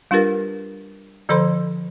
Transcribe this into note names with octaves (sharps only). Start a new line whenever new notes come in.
G3 D4 F4 G4 A#4 B4
D3 F3 A4 C5 B5 C6